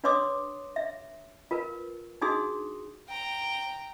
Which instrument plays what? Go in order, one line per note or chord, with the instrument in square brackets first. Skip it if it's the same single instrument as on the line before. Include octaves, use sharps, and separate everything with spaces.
[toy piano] D4 B4 C#5 C6 D6 D#6
E5
F4 A#4 B4
D4 D#4 F#4 G#4 C6 D#6
[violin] G5 A#5